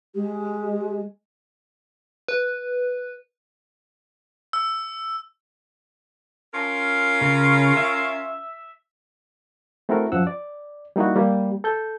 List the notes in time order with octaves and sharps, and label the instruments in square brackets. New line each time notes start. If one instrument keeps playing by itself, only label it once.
[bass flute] G#3 [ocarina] G4
[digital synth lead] B4
[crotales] E6
[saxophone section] C#4 F4 A#4
[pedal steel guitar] C#3
E5
[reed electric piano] A3 C4 E4 F#4 A4 A#4
F#2 F3 F#5 E6
D5
G3 A#3 D#4 E4 F#4
G3 A#3
A4 G6